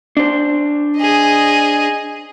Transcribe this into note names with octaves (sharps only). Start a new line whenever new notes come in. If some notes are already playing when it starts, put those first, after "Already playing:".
D4 C5
G#4 D#5